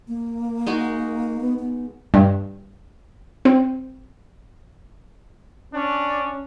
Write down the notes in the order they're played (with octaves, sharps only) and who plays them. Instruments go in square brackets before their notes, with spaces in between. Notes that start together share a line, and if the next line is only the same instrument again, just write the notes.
[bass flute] A#3
[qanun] G#3 D#4 F#4
[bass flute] B3
B3
[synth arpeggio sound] G2
C4
[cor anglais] C#4 [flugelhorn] D4